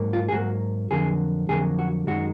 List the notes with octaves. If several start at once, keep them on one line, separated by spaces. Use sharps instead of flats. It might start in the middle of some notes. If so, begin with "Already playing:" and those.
Already playing: G#2 F#3 A#3
F4
G#4
G#2 F#3 A#3 F#4
F2 D3 F#3 A#3 G#4
F2 D3 F#3 A#3 G#4
F#4
F#2 D#3 G#3 F#4